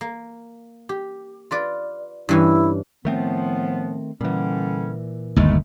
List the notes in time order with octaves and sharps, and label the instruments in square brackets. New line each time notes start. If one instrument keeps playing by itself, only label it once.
[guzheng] A#3
G4
F4 B4 D5
[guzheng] G2 E3 C#4 [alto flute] E4
[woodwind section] A2 F3 B3 [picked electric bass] D#3 A3 C4
[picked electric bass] A#2 E3 [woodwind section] D3 G3 C#4
[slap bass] G1 D#2 [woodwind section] G#3 A3